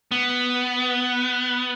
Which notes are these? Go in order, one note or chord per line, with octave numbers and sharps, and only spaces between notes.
B3